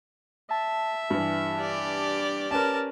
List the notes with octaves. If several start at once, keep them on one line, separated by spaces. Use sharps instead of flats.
E5 A5
G2 E3
G4 D5
C#4 A#4 B4 A5